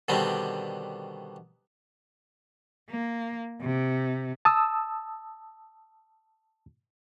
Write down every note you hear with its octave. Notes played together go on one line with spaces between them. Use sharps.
B2 D3 D#3 G3 B3 C4
A#3
C3
A5 D#6 E6